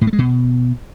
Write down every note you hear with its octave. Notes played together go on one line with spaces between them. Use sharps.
A2
A3
G#3
B2